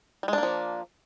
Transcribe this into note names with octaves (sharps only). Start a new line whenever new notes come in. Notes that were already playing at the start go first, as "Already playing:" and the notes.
F3 G3 G#3 A#3 D4